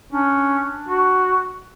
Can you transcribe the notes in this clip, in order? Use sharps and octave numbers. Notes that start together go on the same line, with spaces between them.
C#4 D4
F#4